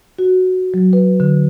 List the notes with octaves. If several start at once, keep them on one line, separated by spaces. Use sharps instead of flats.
F#4
F#3
B4
D3